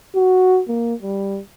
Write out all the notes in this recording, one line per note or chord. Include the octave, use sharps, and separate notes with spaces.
F#4
A#3
G3